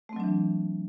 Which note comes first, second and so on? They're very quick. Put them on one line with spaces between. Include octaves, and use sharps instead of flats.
A3 C4 F#3 D4 E3